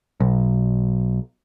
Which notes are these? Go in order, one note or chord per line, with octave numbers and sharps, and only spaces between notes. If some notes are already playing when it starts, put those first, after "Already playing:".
B1